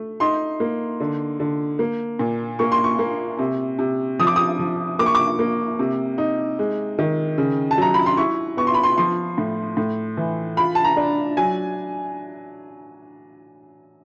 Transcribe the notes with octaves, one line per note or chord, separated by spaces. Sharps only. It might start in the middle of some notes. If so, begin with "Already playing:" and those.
Already playing: A3
D#4 C6
A#3
D3
D3
A#3
A#2
A#3 C#6
C6
C#6
A#3
C3
C3
F3 D#6
D6
D#6
F3
A#3 D6
C#6
D6
A#3
C3
D#4
G#3
D#3
C#3
A5
F#3 A#5
B5
C6
E4 C#6
B3 C#6
C6
B5
C6
F3 C6
A2
A2
E3
F4 B5
A5
A#5
D4
F#3 G#5